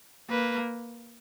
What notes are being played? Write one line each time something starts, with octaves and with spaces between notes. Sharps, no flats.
A#3 B4